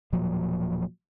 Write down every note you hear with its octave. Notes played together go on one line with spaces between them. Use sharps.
E1 A#2 F3 F#3